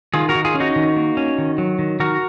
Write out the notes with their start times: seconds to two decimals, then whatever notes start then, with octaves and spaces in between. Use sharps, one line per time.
0.14 D#3 F4 G#4
0.29 F#4 A#4
0.35 D#3
0.45 F4 G#4
0.55 C#4
0.60 D#4 F#4
0.76 D#3
0.96 A#3
1.17 C#4
1.38 D#3
1.58 F#3
1.79 D#3
2.00 D#3 F#4 A#4